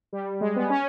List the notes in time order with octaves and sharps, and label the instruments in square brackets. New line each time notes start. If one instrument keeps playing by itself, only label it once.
[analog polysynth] G3
G#3
B3
C#4